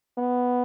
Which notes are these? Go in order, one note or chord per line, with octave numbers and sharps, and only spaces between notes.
B3